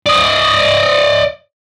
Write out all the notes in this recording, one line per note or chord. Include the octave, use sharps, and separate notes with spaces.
D5 D#5